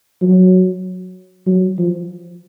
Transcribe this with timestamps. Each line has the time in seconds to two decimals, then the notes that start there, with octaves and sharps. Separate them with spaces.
0.22 F#3
1.47 F#3
1.78 F3